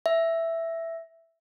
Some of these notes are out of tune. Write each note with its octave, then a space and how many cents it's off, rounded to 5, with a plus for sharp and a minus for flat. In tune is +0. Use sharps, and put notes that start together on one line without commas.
E5 +5